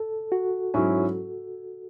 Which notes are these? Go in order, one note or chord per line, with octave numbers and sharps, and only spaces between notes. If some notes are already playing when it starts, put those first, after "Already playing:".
Already playing: A4
F#4
G#2 F#3 C#4 E4